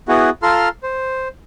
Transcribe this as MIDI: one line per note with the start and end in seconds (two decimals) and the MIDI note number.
0.08 0.30 59
0.08 0.30 64
0.08 0.30 66
0.08 0.30 68
0.43 0.69 65
0.43 0.69 69
0.43 0.69 82
0.43 0.69 84
0.43 0.69 89
0.83 1.28 72